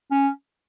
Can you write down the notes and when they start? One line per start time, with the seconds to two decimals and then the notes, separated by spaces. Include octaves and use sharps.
0.11 C#4